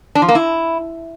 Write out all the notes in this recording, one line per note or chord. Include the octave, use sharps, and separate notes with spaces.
D4
F3
A#3
E4